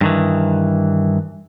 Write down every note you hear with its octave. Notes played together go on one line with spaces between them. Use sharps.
G2 D#3 E3